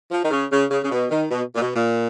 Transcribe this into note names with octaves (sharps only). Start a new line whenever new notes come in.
F3
D#3
C#3
C#3
C#3
C#3
B2
D#3
B2
A#2
B2
A#2